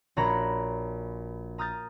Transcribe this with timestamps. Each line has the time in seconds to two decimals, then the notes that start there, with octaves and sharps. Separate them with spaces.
0.17 A#1 F#4 C#5 A#5 B5 A#6
1.58 A#5 D#6 F6 G6 A6